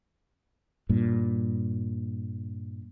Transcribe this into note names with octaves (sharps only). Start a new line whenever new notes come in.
G2 A#2